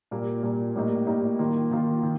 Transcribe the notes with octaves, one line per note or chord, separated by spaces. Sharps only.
A#2 G3 A#3
A#2 G3 A#3
A2 G3 A#3 D#4
A2 G3 A#3 D#4
D#3 A#3 F4
D#3 A#3 F4
D#3